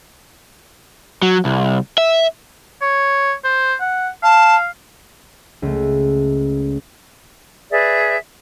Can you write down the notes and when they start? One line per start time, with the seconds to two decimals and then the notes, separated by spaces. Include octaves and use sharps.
1.22 F#3
1.45 C2
1.98 E5
2.81 C#5
3.44 C5
3.80 F#5
4.23 F5 A5
5.62 C#2 A3
7.71 G#4 B4 D5 E5